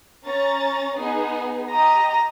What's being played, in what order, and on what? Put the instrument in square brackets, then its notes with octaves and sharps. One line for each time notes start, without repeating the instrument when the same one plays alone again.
[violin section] C#4 A#5 A6
B3 D#4 G#4
[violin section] G4 D#5 D#6 [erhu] A#5